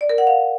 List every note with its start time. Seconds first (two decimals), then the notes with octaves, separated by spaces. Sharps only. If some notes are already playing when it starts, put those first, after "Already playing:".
0.01 D5
0.09 A#4
0.18 F#5
0.27 F5